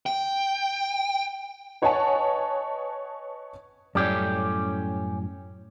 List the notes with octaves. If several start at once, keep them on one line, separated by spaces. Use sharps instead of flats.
G5
B4 C#5 D#5 F#5 G#5 A5
F#2 A2 G3 C#4 G4